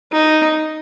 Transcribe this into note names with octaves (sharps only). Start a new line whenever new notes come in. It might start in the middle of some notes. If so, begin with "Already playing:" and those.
D#4